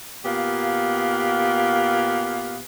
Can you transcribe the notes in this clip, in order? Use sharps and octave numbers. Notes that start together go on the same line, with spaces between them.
A#2 B3 G4 F5